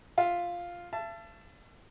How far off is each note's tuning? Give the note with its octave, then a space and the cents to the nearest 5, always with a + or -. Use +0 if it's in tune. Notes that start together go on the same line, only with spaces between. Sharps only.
F4 +0 E5 +5
E5 +45 A5 +0